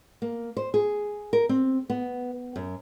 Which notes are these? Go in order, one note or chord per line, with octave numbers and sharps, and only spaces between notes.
A#3
C5
G#4
A#4
C4
B3
F#2